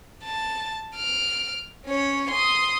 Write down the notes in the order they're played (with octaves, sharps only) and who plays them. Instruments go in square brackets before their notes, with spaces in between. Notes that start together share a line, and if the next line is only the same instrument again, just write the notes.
[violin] A5
F6 D7
C#4 C#5
C6 D#6